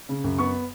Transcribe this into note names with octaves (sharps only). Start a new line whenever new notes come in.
C#3
F#2
B3 C#6